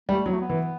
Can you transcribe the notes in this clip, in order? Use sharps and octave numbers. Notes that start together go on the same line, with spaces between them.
G3 A3
F#3 B3
A3
B3
E3